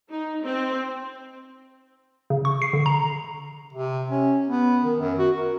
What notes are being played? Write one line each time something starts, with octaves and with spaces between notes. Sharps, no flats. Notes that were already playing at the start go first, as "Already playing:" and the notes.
D#4
C4
C#3
C#6
C7
D3
A#5
C3
C#4
B3
D#3
F#2
F#4
A#4